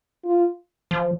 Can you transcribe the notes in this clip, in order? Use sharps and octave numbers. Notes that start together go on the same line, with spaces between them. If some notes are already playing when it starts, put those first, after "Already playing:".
F4
F3